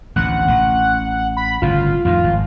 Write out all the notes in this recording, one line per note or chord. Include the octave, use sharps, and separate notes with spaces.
A1 D2 C3 F#5
A1
B5
G1 A2 C#3 F4
F2 A2 D#3 F4
G#1